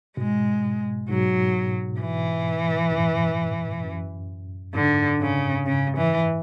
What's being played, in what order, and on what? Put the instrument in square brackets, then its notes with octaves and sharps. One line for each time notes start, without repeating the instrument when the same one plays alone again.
[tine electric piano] G#2 B2 [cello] G#3
[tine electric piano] G#2 B2 [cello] F#3
[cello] E3
[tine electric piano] F#2 A2
F#2
[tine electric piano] G#2 [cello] D3
[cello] C#3
C#3
E3